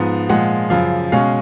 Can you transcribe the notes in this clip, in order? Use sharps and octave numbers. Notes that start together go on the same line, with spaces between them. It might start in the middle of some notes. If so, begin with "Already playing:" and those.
Already playing: G#2 F3 B3
A#2 F3 G#3 F#5
F#2 C#3 F3 F5
B2 G#3 C#4 F5